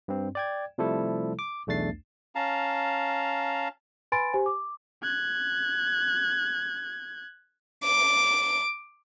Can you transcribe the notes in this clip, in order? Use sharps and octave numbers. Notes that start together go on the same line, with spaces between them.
G2 C4
D5 G5 G#6
C3 F3 G3 A3 E4 A4
D6
B1 E2 A3 D4 A6 C7
C#4 F5 A5 A#5
B4 G#5 B5 C6 A6 D7
G4 C5 G#5
D6
F#6 G#6
D6